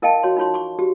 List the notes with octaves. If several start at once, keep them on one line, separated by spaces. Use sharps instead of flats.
E4 A#4 D#5 F5 G5 A5
F#4 C#5 C6
D#4 F4 C#5 C6
C6 C#6
F#4 G4